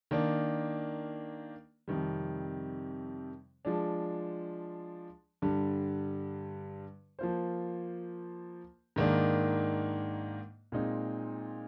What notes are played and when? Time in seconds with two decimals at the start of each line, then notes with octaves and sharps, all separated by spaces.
0.11 D#3 A#3 D4
1.88 F2 C3 D#3 G3
3.65 F3 G#3 D4
5.42 G2 D3 G3
7.19 F3 A#3 F4 C5
8.96 G#2 D#3 A#3 D4
10.72 A#2 G#3 C4 D#4